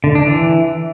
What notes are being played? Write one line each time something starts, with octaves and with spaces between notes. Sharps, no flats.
D3
D4
E3